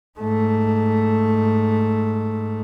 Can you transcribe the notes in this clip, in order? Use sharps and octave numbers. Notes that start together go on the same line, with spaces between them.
G#2 A3